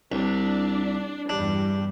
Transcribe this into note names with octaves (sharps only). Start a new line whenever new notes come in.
C2 D4
E2 G2 G3 D4